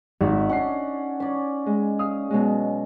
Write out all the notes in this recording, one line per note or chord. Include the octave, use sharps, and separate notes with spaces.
G#1 D#4 E4 F#4 E5
C#4 D4 F#5 C7
C#4 D5
G#3
F5 D#6
B2 F#3 G#3